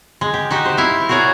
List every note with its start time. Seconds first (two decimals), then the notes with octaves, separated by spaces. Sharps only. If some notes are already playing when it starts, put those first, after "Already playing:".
0.21 G#3
0.34 G4
0.51 D#4 F#4 G4
0.66 C5
0.77 E4 E5 F5
1.09 F#4 G#4 A#4 C#5 D5